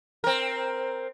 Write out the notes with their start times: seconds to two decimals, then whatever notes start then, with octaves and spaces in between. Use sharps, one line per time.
0.24 C4 A#4